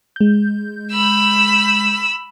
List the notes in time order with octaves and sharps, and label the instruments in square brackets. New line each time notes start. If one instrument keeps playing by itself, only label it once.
[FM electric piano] G#3 G6
[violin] B5 E6